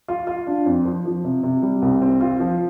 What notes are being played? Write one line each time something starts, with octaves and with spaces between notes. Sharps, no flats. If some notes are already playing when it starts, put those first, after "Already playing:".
F4
F4
D4
F2
F3
F3
C3
C3
G3
C2
C4
F4
F3